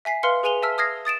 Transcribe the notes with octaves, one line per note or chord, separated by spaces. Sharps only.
E5 G#5 B6 C7
B4 F5 C6 F6 C#7 G7
G#4 B4 G#5 D#7 F7 G7
E5 A5 E6 F6 B6
D#6 F6 G#6 A#6 C7
D#6 A6 D7 E7